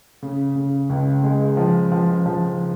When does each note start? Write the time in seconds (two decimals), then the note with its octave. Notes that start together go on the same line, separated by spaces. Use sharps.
0.22 C#3
0.56 C#3
0.89 C#2
1.23 G#3
1.57 F3
1.92 F3
2.26 F3